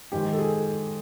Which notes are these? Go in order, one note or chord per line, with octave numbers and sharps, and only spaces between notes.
G#2 D#3 G4
A4
G#4